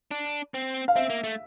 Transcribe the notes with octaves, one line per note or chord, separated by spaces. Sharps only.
D4
C4
F5
C4 E5
A#3
A3